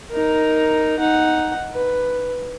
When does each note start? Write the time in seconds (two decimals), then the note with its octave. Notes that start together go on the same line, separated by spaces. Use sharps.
0.11 D#4 A#4
0.99 D#4 F#5
1.73 B4